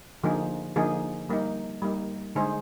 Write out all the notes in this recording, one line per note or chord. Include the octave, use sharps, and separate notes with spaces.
D3 F3 A#3 D#4 G#4
D3 F3 A#3 D#4 G#4
G3 A#3 D#4
G3 A#3 D#4
D3 G#3 D#4 G#4 C5